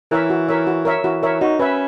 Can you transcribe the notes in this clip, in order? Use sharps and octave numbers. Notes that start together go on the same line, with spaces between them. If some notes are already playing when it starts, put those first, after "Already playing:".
E3 A#4 C#5 E5
F#4
A#4 C#5 E5
F#4
A#4 C#5 E5
E3 F#4
A#4 C#5 E5
D#4 F#4
C#4 B4 E5